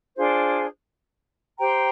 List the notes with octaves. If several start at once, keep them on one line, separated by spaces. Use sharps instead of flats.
D4 F4 G#4 C5
G4 C5 G5 A#5